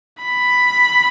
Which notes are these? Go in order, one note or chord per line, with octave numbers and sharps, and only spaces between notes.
B5